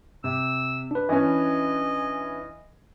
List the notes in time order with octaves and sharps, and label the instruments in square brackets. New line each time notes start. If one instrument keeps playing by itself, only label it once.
[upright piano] C3 [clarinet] E6
[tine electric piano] D4 B4
[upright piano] E3 C#4 [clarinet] D#5